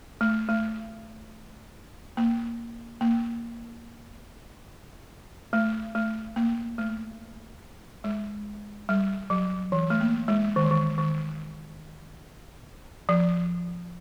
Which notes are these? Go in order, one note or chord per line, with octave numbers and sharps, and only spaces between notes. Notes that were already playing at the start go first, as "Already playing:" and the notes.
A3
A3
A#3
A#3
A3
A3
A#3
A3
G#3
G3
F#3
E3
A3
A#3
G#3
D#3
E3
D#3
D#3
F3